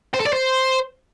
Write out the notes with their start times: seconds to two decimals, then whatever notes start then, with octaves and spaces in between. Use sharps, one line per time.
0.14 C5
0.20 A4
0.27 D5
0.33 C5